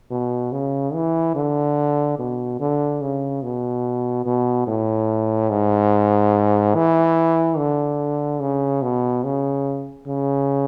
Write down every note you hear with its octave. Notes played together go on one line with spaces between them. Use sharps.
B2
C#3
E3
D3
B2
D3
C#3
B2
B2
A2
G#2
E3
D3
C#3
B2
C#3
C#3